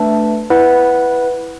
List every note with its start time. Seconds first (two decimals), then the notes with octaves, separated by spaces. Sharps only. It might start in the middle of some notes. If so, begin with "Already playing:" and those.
Already playing: A3 D4 B4 E5 A5
0.50 E4 B4 F#5